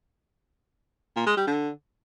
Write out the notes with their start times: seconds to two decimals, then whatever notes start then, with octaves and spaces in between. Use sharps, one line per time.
1.16 A#2
1.27 G#3
1.37 G3
1.47 D3